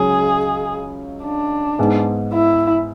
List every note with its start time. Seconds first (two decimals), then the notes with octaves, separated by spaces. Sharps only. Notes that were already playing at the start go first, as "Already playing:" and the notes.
Already playing: C#2 C#3 F#3 C#4 G#4
1.24 D4
1.79 G#2 G#3 B3
2.33 E4